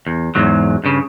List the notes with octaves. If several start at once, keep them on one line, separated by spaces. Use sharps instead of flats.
E2
E2 G#2 F#3
G2 C#3